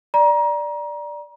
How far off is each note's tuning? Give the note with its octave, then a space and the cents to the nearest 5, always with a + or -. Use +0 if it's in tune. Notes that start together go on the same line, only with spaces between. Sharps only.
D5 +5 A#5 +25